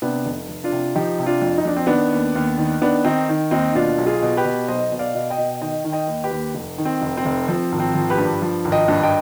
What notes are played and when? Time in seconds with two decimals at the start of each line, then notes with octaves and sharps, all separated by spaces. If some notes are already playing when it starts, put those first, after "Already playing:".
0.02 C3 B3 D4
0.26 F1
0.49 F1
0.64 D4 F4
0.72 C3
0.95 F3 D#4 G4
1.19 C3
1.26 D4 F4
1.42 F2
1.58 D#4
1.65 F2 D4
1.77 C4
1.86 D#3 B3 D4
2.12 D#2
2.35 D#2
2.58 D#3
2.81 D#3 B3 D4
3.05 D#3 C4 D#4
3.29 D#3
3.51 D#2 C4 D#4
3.75 B2 D4 F4
3.98 B1
4.06 F4 G#4
4.22 B2
4.37 G4 B4
4.45 B2
4.68 B1 C5 D#5
4.92 B2
4.99 D5 F5
5.15 B2
5.30 D#5 G5
5.38 B2
5.61 D#3 D#5 G5
5.84 D#3
5.92 D#5 G5
6.08 D#2
6.24 G4 B4
6.31 D#2
6.54 F1
6.78 D#3
6.85 C4
7.02 F1
7.17 C4
7.25 F1
7.48 F3 C4
7.72 G#1
7.80 C4
7.95 F3
8.10 G4 B4
8.18 G2
8.42 F3
8.65 G#1
8.72 D#5 G5
8.88 G2
9.03 D#5 G5